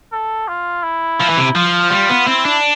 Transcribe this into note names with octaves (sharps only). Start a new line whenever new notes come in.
A4
F4
E4
F3
E3
C3
F3 F4
G3 F4
B3
C4 E4
D4